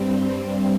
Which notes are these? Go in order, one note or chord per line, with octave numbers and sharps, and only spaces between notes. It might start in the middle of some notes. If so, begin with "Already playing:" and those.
Already playing: G2 G3 C4